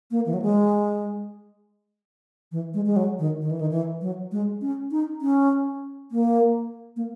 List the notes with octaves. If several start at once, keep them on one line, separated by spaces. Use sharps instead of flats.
A#3
E3
F#3
G#3
E3
G#3
G#3
F#3
D#3
D#3
E3
D#3
E3
F#3
G#3
C#4
D#4
C#4
A#3
A#3